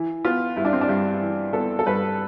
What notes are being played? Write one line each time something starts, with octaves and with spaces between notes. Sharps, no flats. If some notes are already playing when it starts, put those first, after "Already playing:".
Already playing: E3
B3 F4
G2 E4
D4
C4
D4
G2
E3
B3 A4
A4
G2 B4